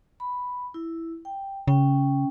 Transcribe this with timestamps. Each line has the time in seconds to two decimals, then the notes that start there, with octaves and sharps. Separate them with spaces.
0.20 B5
0.74 E4
1.25 G5
1.68 C#3 C#4 G5